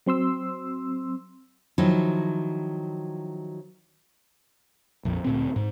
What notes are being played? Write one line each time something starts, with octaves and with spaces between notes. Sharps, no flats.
F#3 C4 C6 E6
D#3 F3 F#3 D#4 E4
A#1 F2
D2 A#2 C4
G#2